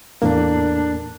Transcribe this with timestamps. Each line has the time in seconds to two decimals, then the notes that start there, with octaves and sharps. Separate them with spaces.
0.22 E2 A2 A#3 D4